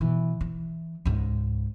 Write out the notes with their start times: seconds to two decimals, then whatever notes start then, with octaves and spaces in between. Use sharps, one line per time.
0.01 B2 E3
0.41 E3
1.05 C#2 G#2